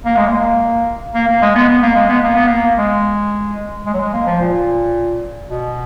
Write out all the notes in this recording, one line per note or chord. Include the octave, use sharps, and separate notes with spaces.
A#3
G#3
A#3
A#3
A#3
G#3
B3
B3
A#3
G#3
B3
A#3
B3
A#3
G#3
G#3
F#3
G#3
A#3
F3
A#2
B2